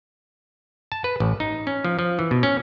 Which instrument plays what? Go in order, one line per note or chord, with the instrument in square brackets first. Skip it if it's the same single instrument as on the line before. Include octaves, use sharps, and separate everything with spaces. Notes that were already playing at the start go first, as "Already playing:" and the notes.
[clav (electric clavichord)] A5
B4
A1
D#4
C#4
F3
F3
E3
B2
C#4